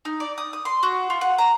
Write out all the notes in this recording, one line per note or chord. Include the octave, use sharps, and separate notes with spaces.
D#4
D5
D#6
D#6
C6
F#4
F4
F#5
A#5